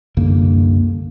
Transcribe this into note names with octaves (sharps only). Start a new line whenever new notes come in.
C2 F#2 D3 A#3